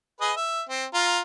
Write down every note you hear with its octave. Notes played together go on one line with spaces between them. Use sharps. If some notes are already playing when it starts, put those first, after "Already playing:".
G#4 B4 D#5
E5
C4
F4 A#5